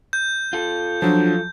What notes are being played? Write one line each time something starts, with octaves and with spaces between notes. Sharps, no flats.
G6
F4 A4
F3 F#3 D4